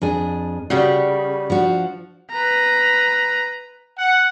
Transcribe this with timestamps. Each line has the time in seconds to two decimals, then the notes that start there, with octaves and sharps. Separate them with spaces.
0.02 F2 D4 G#4
0.70 C#3 G3 F#4
1.50 F3 D4 F#4
2.31 B4 A#5
3.99 F#5